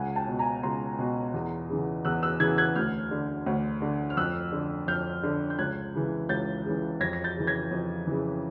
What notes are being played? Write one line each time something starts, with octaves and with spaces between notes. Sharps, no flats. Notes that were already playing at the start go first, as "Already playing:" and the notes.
Already playing: C#2 F#5 G#5
G5 A5
B2
G#5 A#5
C#2 A#5 C6
B2
E2
C#3 E3
E2 E6 F#6
E6 F#6
C#3 E3 F#6 G#6
F#6 G#6
D2 F6 G6
D3
D2
D3
F6
F2 E6 F#6
D3
F2 F6 G6
D3
G6
C#2 F#6 G#6
C#3 E3
C#2 G6 A6
C#3 E3
F2 G#6 A#6
A#6
G6 A6
C#3 E3
G#6 A#6
F2
C#3 E3